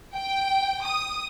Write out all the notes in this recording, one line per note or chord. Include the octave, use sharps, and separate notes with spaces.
G5
D#6